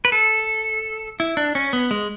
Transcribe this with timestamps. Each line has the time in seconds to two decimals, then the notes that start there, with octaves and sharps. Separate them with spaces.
0.05 B4
0.12 A4
1.20 E4
1.37 D4
1.55 C#4
1.73 B3
1.91 G#3